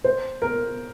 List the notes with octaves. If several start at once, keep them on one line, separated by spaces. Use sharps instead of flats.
C5
A#4